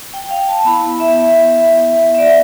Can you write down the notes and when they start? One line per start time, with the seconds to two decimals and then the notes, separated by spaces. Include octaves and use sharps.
0.14 G5
0.31 F5
0.48 A5
0.65 B3 E4 B5
1.00 E5
2.15 E5
2.18 D5